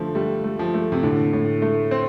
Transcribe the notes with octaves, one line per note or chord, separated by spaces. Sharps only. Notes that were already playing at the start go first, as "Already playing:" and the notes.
Already playing: D3 F3 A3 F4
G3 A3
A3
F3
A3
C3
A2 D3
A2
A3
C4